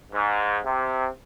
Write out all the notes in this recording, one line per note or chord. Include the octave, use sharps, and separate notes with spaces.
G#2
C3